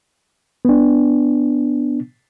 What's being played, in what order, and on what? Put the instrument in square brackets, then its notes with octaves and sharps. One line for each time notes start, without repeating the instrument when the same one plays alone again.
[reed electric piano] B3 D4